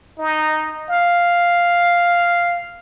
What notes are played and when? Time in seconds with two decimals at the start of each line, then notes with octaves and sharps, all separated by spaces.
0.19 D#4
0.89 F5